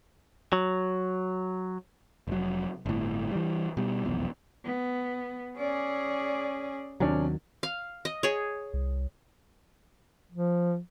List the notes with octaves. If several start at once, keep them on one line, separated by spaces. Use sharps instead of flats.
F#3
F1 F#3
G1 A2
E3 G3
B2 G3
F1 B1 E2
B3
C#4 G#4 D5
D#2 C3 D#3 F#3 C#4 D4
F5
D#5
G#4 C#5
C2
F3